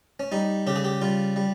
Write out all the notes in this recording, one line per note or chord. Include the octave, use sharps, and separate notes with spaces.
C#4
G3 D#4
C#3 G4
G#4
G4
G3 F4
G3